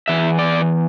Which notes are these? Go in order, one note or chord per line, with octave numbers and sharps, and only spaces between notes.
E2 E3 E5
D5